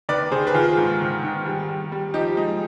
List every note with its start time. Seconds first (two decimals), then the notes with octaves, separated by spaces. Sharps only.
0.09 D#3 B4 D5
0.31 D#3 G#4 C5
0.47 B4
0.54 D#3 F4 G#4
0.77 G#2
1.00 D#3
1.23 D#3
1.46 G3
1.69 G3
1.92 G3
2.14 F3 D#4 G4
2.37 G#3 D#4